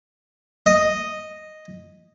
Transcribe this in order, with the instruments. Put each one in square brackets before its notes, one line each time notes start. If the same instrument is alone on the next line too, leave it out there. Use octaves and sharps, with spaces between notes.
[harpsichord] D#5